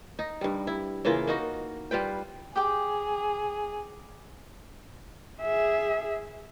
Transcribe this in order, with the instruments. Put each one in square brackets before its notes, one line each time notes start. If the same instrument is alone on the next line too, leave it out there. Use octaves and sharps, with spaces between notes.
[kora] D#4
G2 G3
E4
C#3 E3 A#3 F4
A#3 D#4 F#4
G3 F4 B4 G5
[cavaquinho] G4 G5 D6 [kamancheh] G#4
[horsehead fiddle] G#4 E5